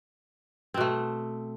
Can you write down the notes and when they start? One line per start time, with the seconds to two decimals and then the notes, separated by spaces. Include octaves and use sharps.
0.74 C4
0.77 B2
0.81 A3